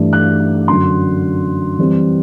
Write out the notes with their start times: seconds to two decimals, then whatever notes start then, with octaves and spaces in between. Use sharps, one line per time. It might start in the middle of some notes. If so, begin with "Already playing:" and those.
Already playing: G2 E3 A3 D4
0.13 F#6
0.68 F#2 D3 F#3 C6
1.79 E3 G3 C4